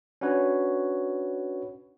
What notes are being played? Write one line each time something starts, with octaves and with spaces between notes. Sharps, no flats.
C#4 D4 F#4 B4 C#5